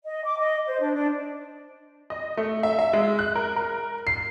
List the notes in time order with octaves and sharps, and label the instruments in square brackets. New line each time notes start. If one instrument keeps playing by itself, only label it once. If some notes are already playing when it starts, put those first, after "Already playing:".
[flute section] D#5
D6
D#5
C5
D4
D4
[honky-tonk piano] D#5
A3
E5
E5
G#3
F#6
A#4
A#4
C7